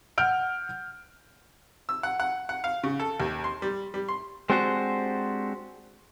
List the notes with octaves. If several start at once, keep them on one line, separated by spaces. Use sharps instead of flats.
F#5 F6 G6 D7
E6
F#5
F#5
F#5
F5
C#3
A4
D#2
C6
G3
G3
C6
G#3 C4 D4 F#4 G4 C5